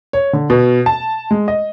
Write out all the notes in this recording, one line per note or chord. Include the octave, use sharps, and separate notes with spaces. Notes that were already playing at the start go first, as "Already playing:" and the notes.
C#5
D3
B2
A5
G#3
D#5